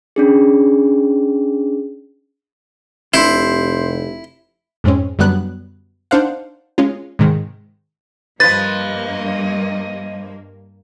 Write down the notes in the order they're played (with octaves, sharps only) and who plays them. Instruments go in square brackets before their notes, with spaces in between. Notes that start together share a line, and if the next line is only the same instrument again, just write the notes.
[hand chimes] C#4 D4 G#4
[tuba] F1 [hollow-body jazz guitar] C3 D4 [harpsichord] E4 [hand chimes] C6 G6 C7
[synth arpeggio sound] F2 G#2 G#3 C4 C#4
F#2 D3 F#3 G3 B3 F#6
D4 D#4 C5 F5 F#5
G#3 C#4 F4
G#2 C3 D#3 G#3
[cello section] G2 A#3 [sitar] F3 B4 [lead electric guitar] D#5 [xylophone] A6